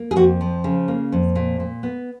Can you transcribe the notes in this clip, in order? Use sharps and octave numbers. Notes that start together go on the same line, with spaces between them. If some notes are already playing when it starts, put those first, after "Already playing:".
Already playing: A#3
G#4
F2 F#4
F3
C#3
A#3
F2
A#2
A#2
B3